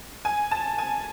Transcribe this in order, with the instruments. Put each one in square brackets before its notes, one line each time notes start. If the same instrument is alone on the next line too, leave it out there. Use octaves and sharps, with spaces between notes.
[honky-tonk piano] G#5
A5
G#5